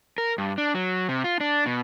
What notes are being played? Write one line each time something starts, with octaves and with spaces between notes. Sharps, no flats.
A#4
G2
D4
F#3
C3
F4
D4
B2